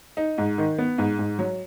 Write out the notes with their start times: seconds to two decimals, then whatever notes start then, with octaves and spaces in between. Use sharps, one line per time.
0.17 D#4
0.38 G#2
0.58 D#3
0.78 B3
0.98 G#2
1.19 G#2
1.39 F#3